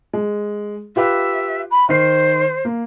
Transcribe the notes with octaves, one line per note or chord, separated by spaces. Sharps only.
G#3
F4 G4 B4 E5
B5
D#3 C5 C7
A#3